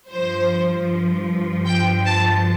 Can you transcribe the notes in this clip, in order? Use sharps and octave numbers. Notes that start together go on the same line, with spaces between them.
G2 F3 C5
G5
A5